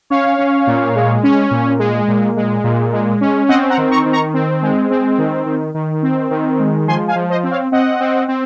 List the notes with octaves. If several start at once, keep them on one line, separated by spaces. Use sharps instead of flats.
C#4 C#5 F5
C#4
A#2
G#3
C#4
A#2
G#3
A#2
G#3
A#2
G#3
C#4
C4 D#5 F#5
F#5 A#5
D#3
A#5 C#6
D#3
A#5 C#6
C4
G#3
C4
D#3
D#3
D#3
C4
D#3
G#3
F3 G#5 C6
F5 G#5
F3
C5 D#5
C4
C#5 F5
C4 D#5 F#5
C4
C4